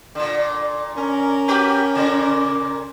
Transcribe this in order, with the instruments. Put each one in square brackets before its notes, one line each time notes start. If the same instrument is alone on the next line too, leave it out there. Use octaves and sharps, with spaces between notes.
[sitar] A#2 D3
[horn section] C#4 A#4
[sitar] F#4 G4 B4
A#2 C#3